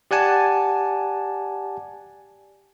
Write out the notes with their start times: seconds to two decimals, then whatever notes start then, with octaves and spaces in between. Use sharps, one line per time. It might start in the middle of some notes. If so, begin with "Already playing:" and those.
0.11 G4 D5 F#5 G#5 A5